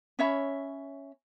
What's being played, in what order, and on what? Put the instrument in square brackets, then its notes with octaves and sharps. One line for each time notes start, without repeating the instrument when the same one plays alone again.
[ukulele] C#4 C#5 E5 B5